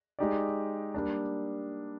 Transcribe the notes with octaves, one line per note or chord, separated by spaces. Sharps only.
G#3 D#4 G4 D5
G3 A#3 D4